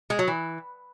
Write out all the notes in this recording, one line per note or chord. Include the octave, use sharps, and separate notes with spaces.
G#3
F#3
E3